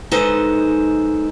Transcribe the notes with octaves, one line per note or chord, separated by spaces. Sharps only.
G#3 D#4 A4 B4 C5